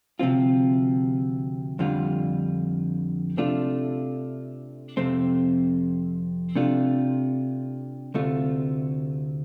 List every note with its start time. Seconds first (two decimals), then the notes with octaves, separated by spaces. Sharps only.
0.19 D2 C3 F3 C4 F4
1.79 F2 D3 G3 F4
3.37 C3 A3 D4 F4
4.97 F2 C3 A3 C4
6.56 C3 A3 D4 F4
8.14 D2 C3 A3 F4